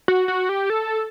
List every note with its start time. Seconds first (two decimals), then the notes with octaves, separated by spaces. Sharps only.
0.08 F#4
0.28 F#4
0.49 G4
0.70 A4